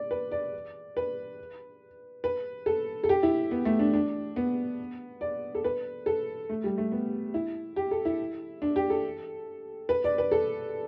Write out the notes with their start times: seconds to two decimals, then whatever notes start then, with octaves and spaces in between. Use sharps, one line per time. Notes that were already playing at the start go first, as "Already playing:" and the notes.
Already playing: D5
0.11 B4
0.32 D5
0.97 B4
2.24 B4
2.66 A4
3.04 A4
3.09 G4
3.23 E4
3.51 B3
3.65 A3
3.79 D4
3.94 D4
4.36 B3
5.21 D5
5.55 A4
5.64 B4
6.06 A4
6.49 A3
6.64 G3
6.78 A3
6.92 B3
7.34 E4
7.76 G4
7.91 A4
8.05 E4
8.62 D4
8.76 G4
8.90 A4
9.89 B4
10.04 D5
10.18 B4
10.31 A4